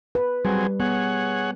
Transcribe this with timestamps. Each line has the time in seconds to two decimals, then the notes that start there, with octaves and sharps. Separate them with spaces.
0.15 B4
0.45 F#3 G3 C4 G#4
0.80 B3 G#4 C#5 F#5